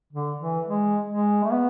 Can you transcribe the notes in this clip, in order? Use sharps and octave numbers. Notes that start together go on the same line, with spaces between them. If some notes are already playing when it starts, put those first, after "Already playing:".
D3
E3
G#3
G#3
A3
B3